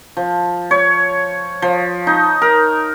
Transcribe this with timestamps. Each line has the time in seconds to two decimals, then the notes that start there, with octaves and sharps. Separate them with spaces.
0.17 F3
0.71 C#5
1.62 F3
2.07 D#4
2.42 A#4